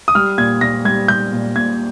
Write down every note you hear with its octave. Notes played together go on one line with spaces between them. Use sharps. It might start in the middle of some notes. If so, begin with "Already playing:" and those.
D#6
G3 F6
A#2 G#6
A#2 A#6
G3 G#6
G3 G6
A#2
A#2 G#6